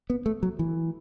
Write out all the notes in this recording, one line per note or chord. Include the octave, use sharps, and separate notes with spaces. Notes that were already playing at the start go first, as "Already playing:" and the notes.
B3
A3
F#3
E3